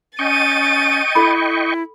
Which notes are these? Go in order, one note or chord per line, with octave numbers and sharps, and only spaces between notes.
C#4 D#5 G5 C#6 A6 D#7
E4 A4 B5